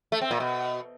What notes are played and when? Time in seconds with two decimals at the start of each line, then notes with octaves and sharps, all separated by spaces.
0.12 A3
0.21 C4
0.31 A#2
0.40 B2